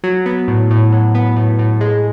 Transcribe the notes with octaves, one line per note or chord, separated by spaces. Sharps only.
F#3
B3
A2
A2
F#3
B3
A2
A2
G#3